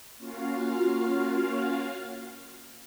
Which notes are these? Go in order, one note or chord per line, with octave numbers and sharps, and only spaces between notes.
A#3 C#4 F4 F#4 F5